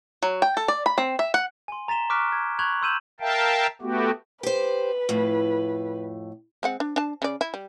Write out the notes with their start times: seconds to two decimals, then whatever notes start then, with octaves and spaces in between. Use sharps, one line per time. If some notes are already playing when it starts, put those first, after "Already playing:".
0.23 F#3
0.42 G5
0.57 A4
0.68 D5
0.86 B5
0.98 C4
1.19 E5
1.34 F#5
1.68 G#5 C6
1.88 A#5 A6 B6 E7 G7
2.10 C#6 D6 F6 F#6 B6 D7
2.32 G#6
2.59 B5 C#6 F#6 G#6 F7 F#7
2.82 C6 E6 G6 D#7 E7 F#7
3.20 A#4 E5 F5 G5 A5
3.82 A3 B3 F#4 G4
4.43 G4 B4 C5
5.09 F2 A2
6.63 G#3 C4 F#5
6.80 D4
6.96 D4 A5
7.22 C#3 D5
7.41 E4
7.54 G3